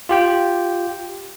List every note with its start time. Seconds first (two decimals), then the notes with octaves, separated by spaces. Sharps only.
0.09 F4 G4 G5